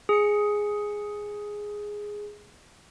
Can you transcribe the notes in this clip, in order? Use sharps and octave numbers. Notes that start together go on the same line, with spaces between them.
G#4 C#7